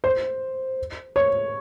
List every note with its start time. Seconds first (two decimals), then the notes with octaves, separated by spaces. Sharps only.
0.04 C5
1.16 C#5